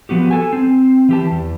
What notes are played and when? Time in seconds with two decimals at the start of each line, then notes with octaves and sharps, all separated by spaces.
0.09 F3 B3 F#4 G4
0.31 A4 G#5
0.53 C4
1.09 E3 G4 A5
1.31 E2